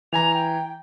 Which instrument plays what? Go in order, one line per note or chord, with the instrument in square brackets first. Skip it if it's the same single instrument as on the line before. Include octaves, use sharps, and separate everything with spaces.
[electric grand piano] E3 G#5 A#5 [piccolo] F7
[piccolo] G5